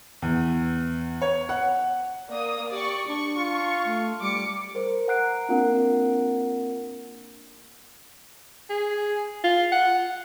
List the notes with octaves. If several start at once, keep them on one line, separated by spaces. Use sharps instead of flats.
E2
C#5
F#5
A#3 D5 D#6
G4 D5 C#6
D4 C#6
F4
A3
G3 D6 C#7
A#4 C5
F#5 A#5 F#6 C7 D7
A#3 C4 D4 F4 A#4 F#5
G#4
F4
F#5